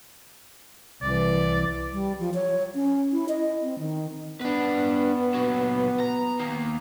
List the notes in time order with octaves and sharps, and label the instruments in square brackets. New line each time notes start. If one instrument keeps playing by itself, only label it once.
[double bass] C2 E3 [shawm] D5
[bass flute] G3
F3
C#5
C#4
E4
D#5
C4
D#3
[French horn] B3 [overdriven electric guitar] D4 B4
[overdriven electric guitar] A#2 F#3
A#5
D#3 A#3